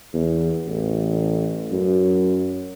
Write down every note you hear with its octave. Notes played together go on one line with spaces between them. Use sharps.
E2
A1
F#2